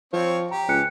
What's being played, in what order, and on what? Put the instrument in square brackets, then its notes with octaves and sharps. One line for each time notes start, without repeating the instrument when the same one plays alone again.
[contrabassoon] F3 [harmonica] C4 C#5
[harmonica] G4 [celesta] A#5
[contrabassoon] C#2 [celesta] G#5 F#6 C#7